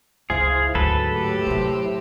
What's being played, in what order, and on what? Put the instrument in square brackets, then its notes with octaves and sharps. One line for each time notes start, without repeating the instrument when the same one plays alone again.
[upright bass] F1 C#2 [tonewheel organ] E4 C5 F5 [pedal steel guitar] G#4
[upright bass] D2 [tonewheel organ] G#2 F#3 A3 [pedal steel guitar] A4 B4
[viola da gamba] A2 G4
[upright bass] C3 F#3 [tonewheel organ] E4 C5